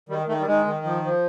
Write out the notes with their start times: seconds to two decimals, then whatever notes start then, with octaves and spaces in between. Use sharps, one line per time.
0.09 D#3 G3
0.27 D#3 A3
0.40 G3
0.47 D#3 G#3
0.66 D#3
0.84 F3
1.03 F3